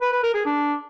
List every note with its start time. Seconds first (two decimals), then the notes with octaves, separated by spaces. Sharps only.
0.01 B4
0.12 B4
0.23 A#4
0.34 G#4
0.45 D4